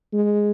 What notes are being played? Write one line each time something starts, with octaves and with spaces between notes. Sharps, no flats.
G#3